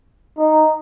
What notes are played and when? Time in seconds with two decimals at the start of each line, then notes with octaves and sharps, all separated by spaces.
0.38 D#4